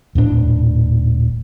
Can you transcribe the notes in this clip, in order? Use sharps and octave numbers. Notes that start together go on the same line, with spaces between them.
D#1 A2 D4